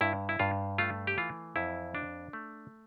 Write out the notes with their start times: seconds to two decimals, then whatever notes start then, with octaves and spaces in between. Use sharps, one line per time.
0.01 G2 E4
0.29 E4
0.39 G2 F4
0.78 A3 F4
1.07 G4
1.18 E3 F4
1.56 F2 E4
1.95 D4
2.33 A3